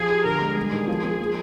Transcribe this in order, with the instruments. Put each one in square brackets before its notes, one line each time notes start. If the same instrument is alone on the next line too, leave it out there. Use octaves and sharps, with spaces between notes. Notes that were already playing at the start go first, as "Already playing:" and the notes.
Already playing: [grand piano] F3 [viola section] G#4
[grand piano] G4
[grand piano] D3 [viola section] A#4
[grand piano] G#3
[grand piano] G3 [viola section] G#4
[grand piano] D#3
F3
F3
A#3